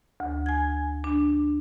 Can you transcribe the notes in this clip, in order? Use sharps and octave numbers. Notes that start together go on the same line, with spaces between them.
D2
G#5 G#6
D4